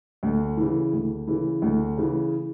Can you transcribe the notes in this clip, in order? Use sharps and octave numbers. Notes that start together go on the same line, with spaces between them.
D2
C#3 E3
D2
C#3 E3
D2
C#3 E3